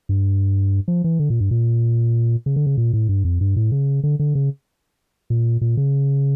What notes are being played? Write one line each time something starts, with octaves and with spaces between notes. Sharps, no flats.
G2
F3
E3
D3
A#2
G2
A#2
C#3
D3
C#3
A#2
A2
G2
F2
G2
A2
C#3
D3
D3
C#3
A#2
A#2
C#3